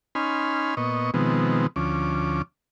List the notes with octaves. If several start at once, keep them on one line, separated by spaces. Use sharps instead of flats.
C#4 D#4 G#5 B5 C6 F6
A#2 B3 D#5 C#6
B2 D#3 F3 G#3 B3 C4
D2 F3 C#4 D6